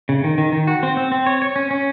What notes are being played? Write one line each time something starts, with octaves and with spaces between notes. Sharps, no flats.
C#3
D#3
D#3
D#3
F#4
C4
C4
C4
C#5
C#5
C#4
C#4